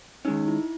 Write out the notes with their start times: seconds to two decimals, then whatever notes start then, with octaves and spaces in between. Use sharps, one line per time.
0.25 D#3 G#3 C#4 D#4
0.48 E4